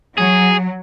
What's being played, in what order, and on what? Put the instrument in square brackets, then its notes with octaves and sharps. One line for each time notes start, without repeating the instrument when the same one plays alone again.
[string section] F#3 [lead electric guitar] G#4